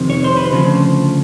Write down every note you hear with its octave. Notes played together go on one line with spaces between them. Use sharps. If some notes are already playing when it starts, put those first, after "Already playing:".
Already playing: F2 C3 D#3
C#5
C5
B4
D2 C#3 F3